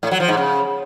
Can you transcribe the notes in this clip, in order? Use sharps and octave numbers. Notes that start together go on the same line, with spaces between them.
A2
F#3
F3
G#2
C#3